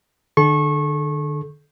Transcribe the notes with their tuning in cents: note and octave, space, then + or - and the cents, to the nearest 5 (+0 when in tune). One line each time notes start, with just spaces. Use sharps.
D3 +35 A4 -30 C#6 -25